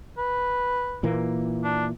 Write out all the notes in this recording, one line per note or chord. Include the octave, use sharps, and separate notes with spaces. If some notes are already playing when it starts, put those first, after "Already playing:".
B4
A#2 E3 A#3
D4